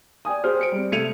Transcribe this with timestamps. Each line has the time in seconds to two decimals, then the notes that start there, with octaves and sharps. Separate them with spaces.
0.25 D5 G5 G#5 D#6
0.44 G#4 C5 F6
0.59 C5 C#7 D7
0.72 G3 C4
0.91 C3 A3 G#6 C#7 D#7 F7